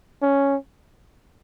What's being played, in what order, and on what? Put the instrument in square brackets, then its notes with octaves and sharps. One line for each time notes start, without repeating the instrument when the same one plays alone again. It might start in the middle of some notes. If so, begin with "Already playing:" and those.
[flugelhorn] C#4